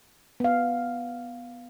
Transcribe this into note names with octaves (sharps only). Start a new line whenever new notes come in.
B3 F5